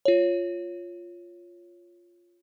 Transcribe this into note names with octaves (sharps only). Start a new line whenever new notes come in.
F4 C#5